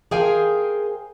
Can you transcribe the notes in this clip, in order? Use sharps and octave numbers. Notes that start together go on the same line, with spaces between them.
G#4 A#4 C5 F5 G5 G#5